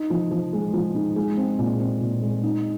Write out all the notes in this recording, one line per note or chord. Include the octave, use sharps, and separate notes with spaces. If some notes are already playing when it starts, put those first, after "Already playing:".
Already playing: D#4
F3
F3
G#3
F3
D#4
G#3
C4
A#2
C4
A#2
G#3
D#4